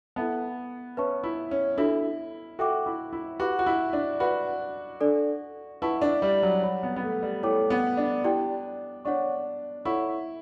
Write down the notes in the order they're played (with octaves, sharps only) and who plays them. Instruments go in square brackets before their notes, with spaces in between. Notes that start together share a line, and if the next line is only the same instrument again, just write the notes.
[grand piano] B3 [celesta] E4 A4 E5 A5
[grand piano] C#4 [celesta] B4 E5 A5 C#6
[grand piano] E4
C#4
[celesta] D4 F#4 A4 E5 [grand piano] E4
[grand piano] F#4 [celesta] A4 E5 G5 D6
[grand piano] E4
E4
[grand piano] F#4 [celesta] G4 B4 F#5 B5 D6
[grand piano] F#4
E4
D4
[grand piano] F#4 [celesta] B4 F#5 B5
[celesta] D4 A4 D5
[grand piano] E4 [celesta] B4 F#5 A5 C#6
[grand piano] D4
G3
F#3
[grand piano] G3 [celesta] C#5 F#5 B5
[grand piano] B3
B3
A3
G3
[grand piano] A3 [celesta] E4 A4 C#5 G5 D6
[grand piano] B3
D4
[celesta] E4 G4 D5 G5
[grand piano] D4 [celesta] C#5 F#5 C#6
[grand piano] E4 [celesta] A4 C#5 F#5 C#6